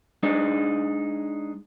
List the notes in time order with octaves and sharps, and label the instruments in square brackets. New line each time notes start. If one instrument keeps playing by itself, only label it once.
[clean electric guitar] G#3 D4 D#4